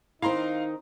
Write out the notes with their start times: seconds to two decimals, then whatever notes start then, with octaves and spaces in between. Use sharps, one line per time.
0.22 D#3 C4 D#4 E4 F5 A#5 C6